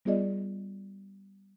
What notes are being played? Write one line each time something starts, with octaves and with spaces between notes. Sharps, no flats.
G3 B3 F4 G#4 D5 D#5